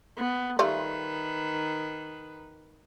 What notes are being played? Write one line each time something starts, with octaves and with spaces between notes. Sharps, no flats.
B3
D#3 G3 A3 F4 B4